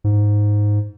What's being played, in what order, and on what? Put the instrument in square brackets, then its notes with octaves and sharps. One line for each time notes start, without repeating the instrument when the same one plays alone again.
[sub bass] G#2